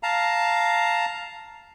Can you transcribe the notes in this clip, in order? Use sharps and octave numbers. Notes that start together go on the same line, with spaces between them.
F5 A5 A#5